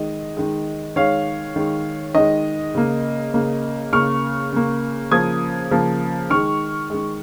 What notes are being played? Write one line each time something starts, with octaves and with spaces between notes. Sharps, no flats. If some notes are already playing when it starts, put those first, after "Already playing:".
Already playing: D#3 G#3 D#5
D#3 G#3
D#3 G#3 C#5 F5
D#3 G#3
D#3 G#3 D#5
C#3 A#3
C#3 A#3
C#3 A#3 C#6 F6
C#3 A#3
C#3 F3 A#3 D#6 G#6
C#3 F3 A#3
D#3 G#3 C#6 F6
D#3 G#3